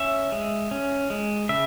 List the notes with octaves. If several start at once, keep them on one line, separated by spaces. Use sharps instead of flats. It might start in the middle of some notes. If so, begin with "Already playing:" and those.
Already playing: C#4 E5
G#3
C#4
G#3
C#3 E5